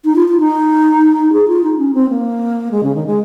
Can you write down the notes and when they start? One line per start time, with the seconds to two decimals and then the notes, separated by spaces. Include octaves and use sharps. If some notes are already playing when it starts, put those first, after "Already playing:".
0.05 D#4
0.16 F4
0.28 F4
0.40 D#4
1.32 G#4
1.48 F4
1.64 D#4
1.78 C#4
1.94 C4
2.10 A#3
2.71 G#3
2.83 C#3
2.95 D#3
3.07 G#3